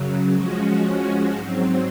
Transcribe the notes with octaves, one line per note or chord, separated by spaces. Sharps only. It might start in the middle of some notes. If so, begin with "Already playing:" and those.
Already playing: F#2 C#3 F#3
F3 G#3 C#4 F#4
G#2 F#3 C4